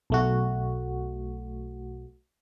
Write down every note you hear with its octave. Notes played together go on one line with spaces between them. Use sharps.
B1 A3 F#4